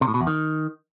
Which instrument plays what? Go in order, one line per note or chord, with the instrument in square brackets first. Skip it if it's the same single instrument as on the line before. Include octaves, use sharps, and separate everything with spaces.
[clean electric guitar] C3
A2
B2
E2
D#3